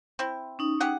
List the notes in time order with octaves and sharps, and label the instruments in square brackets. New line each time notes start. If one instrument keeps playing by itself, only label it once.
[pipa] C4 E4
[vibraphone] C#4 D#4 D#6
[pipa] G4 G#4 F#5